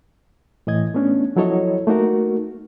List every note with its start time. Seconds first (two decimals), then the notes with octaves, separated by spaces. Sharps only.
0.67 A2 E3 D#5 G#6
0.94 A3 B3 C#4 D4
1.36 F3 F#3 E4 A4 C#5 D#5
1.87 A3 A#3 D#4 F#4 A#4